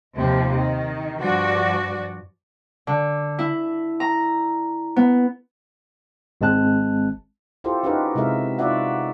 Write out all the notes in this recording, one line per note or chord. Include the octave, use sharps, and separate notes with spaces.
D#2 C3 F3
D#3
G2 F3 F#4 D5
D3
E4
A#5
B3
G#1 G#3 C4 A5 F#6
E4 F4 G4 A4 C5
C#4 D#4 F#4 G4 A#4 B4
C3 G#3 E4 A#4 E5
D#4 F4 F#4 D5 E5 F#5